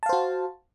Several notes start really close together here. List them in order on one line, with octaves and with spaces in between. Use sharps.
A5 F5 C5 F#4